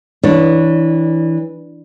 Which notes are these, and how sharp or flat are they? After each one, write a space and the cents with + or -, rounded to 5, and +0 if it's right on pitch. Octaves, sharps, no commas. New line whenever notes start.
E3 -15 D4 +0 C#5 +0